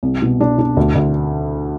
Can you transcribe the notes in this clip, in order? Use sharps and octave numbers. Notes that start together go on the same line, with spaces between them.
C2
B2
D4
D4
D2
D2